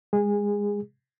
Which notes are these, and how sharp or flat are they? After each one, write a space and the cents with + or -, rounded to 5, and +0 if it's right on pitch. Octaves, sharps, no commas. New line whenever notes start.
G#3 -25 G#4 -20